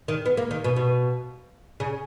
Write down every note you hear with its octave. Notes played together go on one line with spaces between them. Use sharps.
D#3
B3
A#3
D#3
B2
B2
C#3